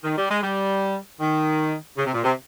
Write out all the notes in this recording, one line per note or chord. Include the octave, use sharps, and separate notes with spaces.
D#3
G3
G#3
G3
D#3
C#3
C3
A#2
C3